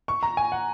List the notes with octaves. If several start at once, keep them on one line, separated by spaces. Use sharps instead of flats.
C#6
A#5
G#5
F#5